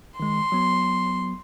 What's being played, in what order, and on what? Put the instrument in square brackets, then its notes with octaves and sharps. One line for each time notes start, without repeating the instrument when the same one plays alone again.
[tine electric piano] D#3 G#3 [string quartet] C6
[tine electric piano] F#3 B3